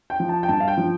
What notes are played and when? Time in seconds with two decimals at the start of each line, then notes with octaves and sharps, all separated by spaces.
0.10 G5
0.20 F3
0.29 A5
0.43 G5
0.49 G2 A5
0.60 F5
0.68 G5
0.77 F3